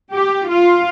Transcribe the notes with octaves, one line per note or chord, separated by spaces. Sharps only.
G4
F4